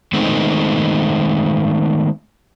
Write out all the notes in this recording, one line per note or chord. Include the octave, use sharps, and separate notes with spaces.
D#3 G#3 A3 B3 C4 D#4